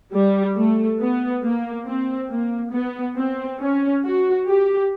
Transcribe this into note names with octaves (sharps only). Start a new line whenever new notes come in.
G3
A3
B3
A#3
C4
A#3
B3
C4
C#4
F#4
G4